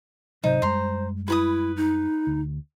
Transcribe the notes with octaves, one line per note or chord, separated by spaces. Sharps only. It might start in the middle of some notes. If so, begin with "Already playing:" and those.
G#1 C3 F#3 D#4 C5
F#2 G3 G#3 A#5 C6
E4 B4 B5 D#6
D#4
D2